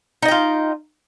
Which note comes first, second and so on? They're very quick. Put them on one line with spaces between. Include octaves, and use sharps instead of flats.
D#4 D#5 G5 F4